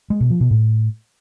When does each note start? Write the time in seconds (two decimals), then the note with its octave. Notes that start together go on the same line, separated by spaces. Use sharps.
0.10 G#3
0.20 B2
0.30 F3
0.40 B2
0.51 A2